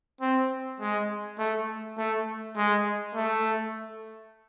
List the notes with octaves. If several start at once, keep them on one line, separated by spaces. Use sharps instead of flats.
C4
G#3
A3
A3
G#3
A3